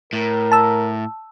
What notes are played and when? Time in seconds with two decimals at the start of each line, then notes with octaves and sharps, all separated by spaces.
0.13 A2 A#4
0.52 A5 E6